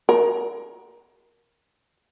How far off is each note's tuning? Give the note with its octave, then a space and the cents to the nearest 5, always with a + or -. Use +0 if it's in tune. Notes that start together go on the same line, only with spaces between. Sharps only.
A#4 +15